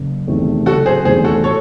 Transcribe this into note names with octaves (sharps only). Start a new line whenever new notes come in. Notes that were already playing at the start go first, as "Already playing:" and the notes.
Already playing: F#1
E2 C3 D#3 A3
F#1 F#4 A4
G#4 C5
E2 C3 D#3 A3 G#4 C5
F#4 A4
A4 C#5